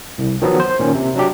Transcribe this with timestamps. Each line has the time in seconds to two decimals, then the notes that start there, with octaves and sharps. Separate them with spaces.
0.18 C2
0.42 D#3 F3 F#3 B3
0.60 C5
0.79 A#2 D#3 C#4
0.95 C3
1.15 F#3 D4 G4